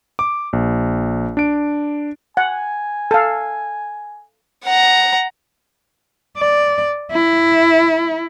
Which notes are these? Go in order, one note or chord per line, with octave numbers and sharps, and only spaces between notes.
D6
A#1
D4 D7
F#5 G#5
A4 F5
F#5 A#5
D5
E4